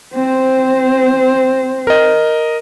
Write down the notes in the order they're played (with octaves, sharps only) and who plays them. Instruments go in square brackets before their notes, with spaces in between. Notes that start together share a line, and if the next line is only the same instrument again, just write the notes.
[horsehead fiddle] C4 C5
[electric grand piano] A#4 D#5